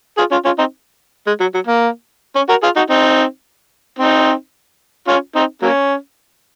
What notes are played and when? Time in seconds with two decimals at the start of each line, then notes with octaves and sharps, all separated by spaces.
0.17 F4 G#4
0.31 C#4 F4
0.45 C#4 F4
0.58 C4 D#4
1.27 G#3
1.40 F#3
1.54 F#3
1.67 A#3
2.36 C#4
2.49 F#4 A#4
2.62 F4 G#4
2.76 D#4 F#4
2.90 C4 D#4
3.99 C4 D#4
5.08 C#4 F4
5.35 C4 D#4
5.62 F#3 A#3 C#4